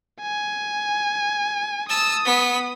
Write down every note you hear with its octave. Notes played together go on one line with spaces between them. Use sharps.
G#5
A5 D#6 E6
B3 B6